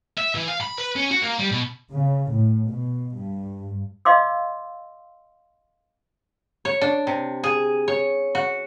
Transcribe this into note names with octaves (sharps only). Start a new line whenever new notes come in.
E5
E3
F5
B5
B4
C#4
F#4
A#3
G3
B2
C#3
A2
B2
G2
D#5 F5 C6 D6 E6
C#5
D4
C3
G#4
C#5
F#4